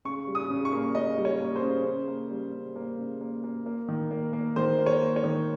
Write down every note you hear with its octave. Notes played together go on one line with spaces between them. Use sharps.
C#3 C#6
G3
D#6
C#3
C#6
A#3
C#3 D#5
G3
C#5
A#3
C5
C#3
C#3
A#3
G3
C#3
A#3
C#3
A#3
A#3
A#3
D#3
A#3
A#3
D#3 C5
A#3
C#5
A#3
C#5
D#3